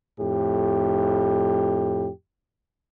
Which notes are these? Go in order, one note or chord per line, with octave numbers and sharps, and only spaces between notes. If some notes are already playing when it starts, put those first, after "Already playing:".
F2 A2 G4